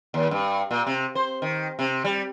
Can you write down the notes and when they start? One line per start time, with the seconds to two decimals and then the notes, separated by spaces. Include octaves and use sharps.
0.14 D#2
0.31 G2
0.71 A#2
0.86 C3
1.15 C5
1.42 D#3
1.79 C3
2.04 G3